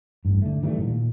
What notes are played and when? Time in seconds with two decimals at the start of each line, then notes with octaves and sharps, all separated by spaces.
0.25 A1 G2
0.42 D3 A3
0.63 D#3 E3 G3 A3
0.79 A#2